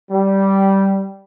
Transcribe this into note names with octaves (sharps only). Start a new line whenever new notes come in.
G3